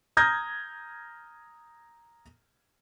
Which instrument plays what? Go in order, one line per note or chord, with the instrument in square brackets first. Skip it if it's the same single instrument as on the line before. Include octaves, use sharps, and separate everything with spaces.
[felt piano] A#5 D#6 F6 G6 G#6 A#6